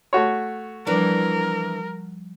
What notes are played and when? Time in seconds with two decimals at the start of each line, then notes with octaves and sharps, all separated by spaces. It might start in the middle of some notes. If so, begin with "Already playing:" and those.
0.13 A3 F#4 C#5
0.87 E3 F3 G3 D4 A#4